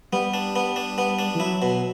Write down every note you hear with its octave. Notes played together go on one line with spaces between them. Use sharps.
G3 B3
D4
B3
D4
B3
D4
E3
F#3 E4
B2